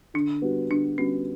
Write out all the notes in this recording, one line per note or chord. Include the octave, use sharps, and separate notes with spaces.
D3 D4
G3 B3 F#4
D3 D4
G3 B3 C#4 F#4